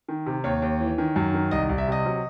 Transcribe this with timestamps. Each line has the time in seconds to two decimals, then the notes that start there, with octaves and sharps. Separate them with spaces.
0.08 D#3
0.26 C3
0.44 D#2 C#5
0.62 D#2
0.80 E3
0.98 D#3
1.16 F#2
1.34 D#3
1.51 C2 D#5
1.69 C2
1.78 E5
1.87 C3 D#5
2.06 F#3